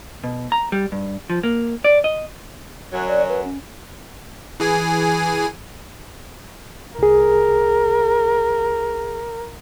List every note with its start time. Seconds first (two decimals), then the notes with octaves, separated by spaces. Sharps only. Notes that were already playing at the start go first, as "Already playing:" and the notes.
0.24 B2
0.52 A#5
0.72 G3
0.92 G2
1.30 F3
1.43 A#3
1.84 D5
2.04 D#5
2.93 F#2 F#3
3.08 D5
3.29 B4
3.44 C#4
4.60 E3 G#4 G#5
6.99 C2 G#4 A#4